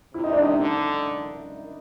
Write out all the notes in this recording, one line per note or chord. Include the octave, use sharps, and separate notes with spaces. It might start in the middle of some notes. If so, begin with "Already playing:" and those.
C3 E4
D#4
D4
D#4
D3